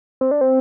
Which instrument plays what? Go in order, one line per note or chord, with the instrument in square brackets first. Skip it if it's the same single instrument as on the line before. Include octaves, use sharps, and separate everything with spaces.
[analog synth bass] C4
D4
C4